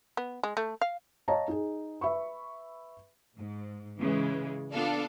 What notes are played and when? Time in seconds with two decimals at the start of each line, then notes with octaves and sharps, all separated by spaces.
0.17 B3
0.43 G#3
0.57 A3
0.82 F5
1.28 C#5 D#5 F5 A5 A#5
1.48 D#4 G#4
2.01 B4 E5 B5 C#6
3.36 G#2
3.99 C#3 E3 G#3
4.72 B3 D4 F4 A4 D5 F5